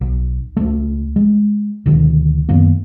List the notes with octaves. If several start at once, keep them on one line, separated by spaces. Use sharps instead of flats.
B1
C#2 A3
G#3
D2 B2 D#3
F#2 D#3 A#3 B3